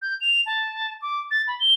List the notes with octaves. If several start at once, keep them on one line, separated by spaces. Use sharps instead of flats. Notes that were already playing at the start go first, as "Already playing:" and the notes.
G6
F7
A5
D6
A6
B5
G7